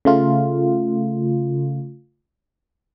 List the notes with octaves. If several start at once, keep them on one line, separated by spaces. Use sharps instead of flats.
C#3 A3 F4